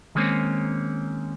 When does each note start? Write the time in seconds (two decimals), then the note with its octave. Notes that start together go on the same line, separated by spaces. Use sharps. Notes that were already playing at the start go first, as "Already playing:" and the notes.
0.15 D#3 G3 G#3 A#3 C4 C#4